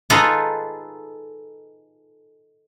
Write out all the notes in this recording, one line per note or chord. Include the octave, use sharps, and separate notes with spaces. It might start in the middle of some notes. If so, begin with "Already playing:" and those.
D#4 F4 G#4 A4 B4 A#5